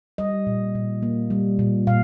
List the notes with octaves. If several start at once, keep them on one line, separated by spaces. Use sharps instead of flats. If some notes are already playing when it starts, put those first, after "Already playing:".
G3 D#5
A#2
A#2
A#3
G3
A#2
A#2 F5